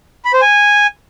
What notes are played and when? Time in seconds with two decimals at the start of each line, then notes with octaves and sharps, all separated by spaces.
0.25 B5
0.33 C5
0.42 G#5